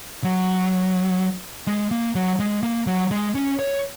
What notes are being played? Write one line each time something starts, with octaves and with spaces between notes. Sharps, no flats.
F#3
G#3
A#3
F#3
G#3
A#3
F#3
G#3
C#4
C#5